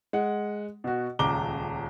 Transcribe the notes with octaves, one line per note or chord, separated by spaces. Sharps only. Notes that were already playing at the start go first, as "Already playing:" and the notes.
G#3 F#5
B2 F#4
D#1 C#2 A#5 D6 G7